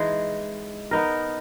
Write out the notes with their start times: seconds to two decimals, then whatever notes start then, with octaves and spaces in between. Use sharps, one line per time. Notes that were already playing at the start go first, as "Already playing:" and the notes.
Already playing: E3 G#3 D#4 G#4
0.91 B3 D#4 A#4